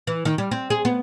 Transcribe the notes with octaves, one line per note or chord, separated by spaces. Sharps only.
E3
D#3
G3
C4
G#4
B3